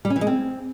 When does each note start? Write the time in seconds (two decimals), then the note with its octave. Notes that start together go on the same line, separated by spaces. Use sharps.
0.05 G3
0.10 C#4
0.16 E3
0.21 G#3
0.27 C4